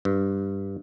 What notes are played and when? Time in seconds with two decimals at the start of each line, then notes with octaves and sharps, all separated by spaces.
0.05 G2